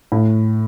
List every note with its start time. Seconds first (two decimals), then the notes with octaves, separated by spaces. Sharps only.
0.12 A2